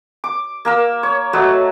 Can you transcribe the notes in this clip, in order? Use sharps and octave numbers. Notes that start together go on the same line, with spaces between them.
D6
A#3 A#4 E6
C#5
F#3 A3 B4 D#5